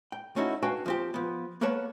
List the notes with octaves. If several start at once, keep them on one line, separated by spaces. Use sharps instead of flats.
G5
A3 C#4 D#4 E4 F#4
D4 F#4 B4 F5 G5 G#5
F3 C4 G4
F3 B3
A#3 B3 A#4 B4 C#5 A5